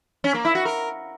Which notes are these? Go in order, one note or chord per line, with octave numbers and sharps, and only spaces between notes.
C#4
A#3
E4
F#4
A#4